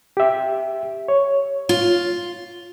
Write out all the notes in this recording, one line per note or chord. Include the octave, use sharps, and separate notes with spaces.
G4 E5
C#5
F4